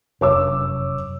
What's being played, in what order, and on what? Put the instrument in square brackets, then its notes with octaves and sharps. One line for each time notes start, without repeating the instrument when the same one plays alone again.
[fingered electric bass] F1 F#2 [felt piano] C#5 D6 E6